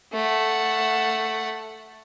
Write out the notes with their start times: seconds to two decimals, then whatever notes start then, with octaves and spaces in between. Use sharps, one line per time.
0.13 A3 F#5